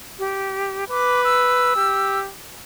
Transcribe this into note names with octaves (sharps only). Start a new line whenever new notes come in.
G4
B4 D6
E6
G4